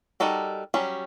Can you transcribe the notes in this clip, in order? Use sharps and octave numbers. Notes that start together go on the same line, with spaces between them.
G3 D#4 F#4 A4 A#4
F#3 G3 C#4